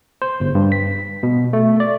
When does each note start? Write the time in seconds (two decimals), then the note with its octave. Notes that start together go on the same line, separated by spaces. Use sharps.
0.22 C5
0.40 G1
0.55 G2
0.72 B6
1.23 B2
1.53 A3
1.80 D5